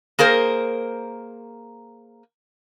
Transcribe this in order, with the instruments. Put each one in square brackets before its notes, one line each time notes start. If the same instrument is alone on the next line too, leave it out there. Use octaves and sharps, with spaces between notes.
[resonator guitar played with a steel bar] A#3 G#4 A#4 C5